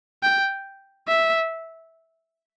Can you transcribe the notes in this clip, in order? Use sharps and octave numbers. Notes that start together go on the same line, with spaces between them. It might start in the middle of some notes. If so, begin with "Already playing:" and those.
G5
E5